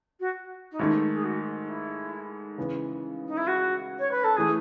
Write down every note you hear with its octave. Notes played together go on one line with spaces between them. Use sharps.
F#4
D#4
G#2 D#3 A3 E4
G#4
F#4
D#4
E4
C#3 E3 B3
D#4
E4
F#4
C#5
B4
A4
E3 A3 G#4